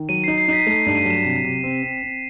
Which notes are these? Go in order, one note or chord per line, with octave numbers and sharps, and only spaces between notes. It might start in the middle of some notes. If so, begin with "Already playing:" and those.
Already playing: D#3
F#3 D#7
D#4 C7
C7
D#4 B6
D#7
A3 C7
G2 C7
D#7
F#3
E7
C3
C3
C4
C4
C4